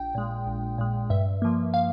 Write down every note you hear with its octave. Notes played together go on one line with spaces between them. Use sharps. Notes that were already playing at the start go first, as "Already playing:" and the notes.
Already playing: A#1 G5
A#2 G#3
A#1
A#2 G#3
G2 E5
F3 A#3
F5